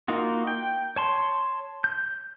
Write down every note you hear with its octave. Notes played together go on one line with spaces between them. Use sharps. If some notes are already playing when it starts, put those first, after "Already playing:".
A#3 D#4 F4 F#4
G5
C#5 A5 C6
G6